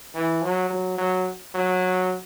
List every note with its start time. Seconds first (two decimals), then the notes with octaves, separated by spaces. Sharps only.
0.14 E3
0.42 F#3
0.70 F#3
0.98 F#3
1.54 F#3